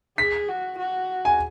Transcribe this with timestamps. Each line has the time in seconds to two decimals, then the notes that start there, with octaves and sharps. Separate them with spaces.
0.18 G#4 B6
0.48 F#4
0.78 F#4
1.25 G#5